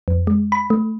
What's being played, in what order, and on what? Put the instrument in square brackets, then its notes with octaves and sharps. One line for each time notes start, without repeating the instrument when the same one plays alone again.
[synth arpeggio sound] F2
G#3
B5
A3